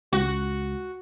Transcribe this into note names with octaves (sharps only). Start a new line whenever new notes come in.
C#2 F#4